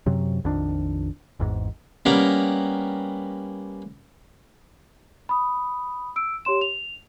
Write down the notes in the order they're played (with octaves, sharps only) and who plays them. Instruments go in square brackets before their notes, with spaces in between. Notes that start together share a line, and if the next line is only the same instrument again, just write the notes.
[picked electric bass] F#2 C3 F#3
A#1 F2 D#3 D4
G#1 E2 G#2
[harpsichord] G3 A#3 B3 C#4 A#4
[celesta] B5 D#6
E6 D7
G4 C#5 C6 E7
F7